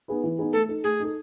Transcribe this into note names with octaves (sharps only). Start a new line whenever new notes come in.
B3 D#4 G#4 B4
E3
B3 D#4 G#4 B4
A3 A4
D#4 A4
A3 G#4
D#4 A4